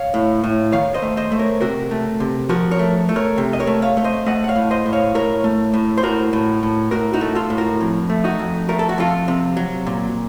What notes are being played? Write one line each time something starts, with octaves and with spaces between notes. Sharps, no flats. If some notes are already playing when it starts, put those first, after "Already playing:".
Already playing: C#5 F5
A2
A2
D#3 C#5 F5
C5 D#5
A3
C5 D#5
A3
A#4 C#5
C3 F#4 A#4
A3
C3
F3 F#4 A#4
A#4 C#5
A3
A3
A#4 C#5
C3
D#5
A#4 C#5
A3
C#5 F5
A3 C#5
C5 D#5
A3 D#5 F#5
F#5
C#5 F5
A2
C5 D#5
A2
C#5 F5
A2 A#4 C#5
A3
A2
C5
A2 F#4 A#4
A2
A2
A2 F#4 A#4
D#4 F#4
A3
F4 A4
A2
F#4 A#4
F2
A3
D#4 F#4
F2
A3 A#4
A4
F#4
F2 F4 A4
C3
F#3
A#2